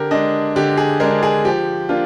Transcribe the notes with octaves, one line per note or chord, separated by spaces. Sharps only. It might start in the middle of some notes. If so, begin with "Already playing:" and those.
Already playing: D3 G4 A#4
G#3 D4 D#5
D3 G4
G#4
G#3 D4 A#4
G#4
F3 G4
A#3 D4 F4